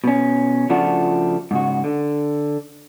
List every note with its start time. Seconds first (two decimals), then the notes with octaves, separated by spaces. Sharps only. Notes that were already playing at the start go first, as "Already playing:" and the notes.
0.04 B2 C#4
0.69 C#3 F3 A3 D4 F4 F#4
1.51 G#2 C#3 F#4
1.84 D3